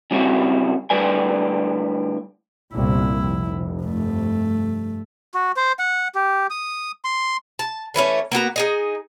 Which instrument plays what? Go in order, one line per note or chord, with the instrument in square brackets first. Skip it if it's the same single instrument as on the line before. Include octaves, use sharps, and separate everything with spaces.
[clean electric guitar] C#3 G3 C4 E4 F#4 C#5
A2 D3 G3 B4 D5 G#5
[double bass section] G1 C2 A#2 [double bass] E4
[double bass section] F1
[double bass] G2 A3
[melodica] F#4
C5
F#5
G4
D#6
C6
[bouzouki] A5
D3 E3 A3 C#4
A#3 B3 F#4 A#5
D#4 G#4 D#5